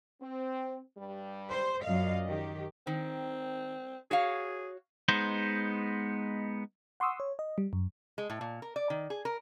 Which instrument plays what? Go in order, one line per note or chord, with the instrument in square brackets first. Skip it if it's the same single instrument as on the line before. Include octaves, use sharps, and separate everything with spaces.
[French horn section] C4
G2 G3
[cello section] C5
[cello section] F#2 F5 [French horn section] A#2 D5 D#5
[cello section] D#3 G4
[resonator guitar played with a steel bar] D#3 [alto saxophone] C4
[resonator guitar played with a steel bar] F#4 C#5 F5 [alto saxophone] G#4
[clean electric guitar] G#3 B3 D#4 C5
[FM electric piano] F#5 C6 C#6 D#6 E6
C#5
D#5
G3
F#2
[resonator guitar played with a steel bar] G#3
A2
A#2
A#4
D5
D#3
G#4
A#4